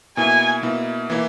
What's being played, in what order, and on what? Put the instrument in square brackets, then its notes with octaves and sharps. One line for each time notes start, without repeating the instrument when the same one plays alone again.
[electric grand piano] B2 A#3 E4 [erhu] G#5
[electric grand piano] B2 A#3 E4
E3 A#3 E4